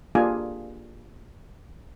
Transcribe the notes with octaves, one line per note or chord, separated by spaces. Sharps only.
A#3 D4 F4 G4 G#4 G#5